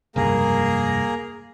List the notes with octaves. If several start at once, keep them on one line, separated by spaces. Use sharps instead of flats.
F1 C#2 G2 A#3 G#4 A#4